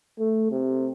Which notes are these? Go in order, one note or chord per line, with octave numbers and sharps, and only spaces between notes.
A3
C3